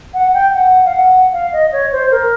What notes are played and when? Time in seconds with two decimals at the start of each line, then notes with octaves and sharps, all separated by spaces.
0.14 F#5
0.34 G5
0.54 F#5
0.85 F5
0.93 F#5
1.33 F5
1.53 D#5
1.72 C#5
1.92 C5
2.11 A#4